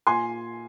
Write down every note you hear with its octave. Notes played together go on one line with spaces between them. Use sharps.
A#2 G#5 C6